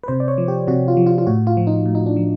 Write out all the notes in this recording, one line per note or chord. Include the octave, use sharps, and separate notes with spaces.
B4
C3 C5
D5
C#5
F3
G4
C3 F#4
F4
F3
F4
F4
A2 F#4
F4
F3
D#4
A2
D#4
D4
F3